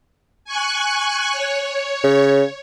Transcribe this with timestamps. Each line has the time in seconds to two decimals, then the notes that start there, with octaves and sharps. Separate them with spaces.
0.45 G#5 C#6 F#6
1.32 C#5
2.04 C#3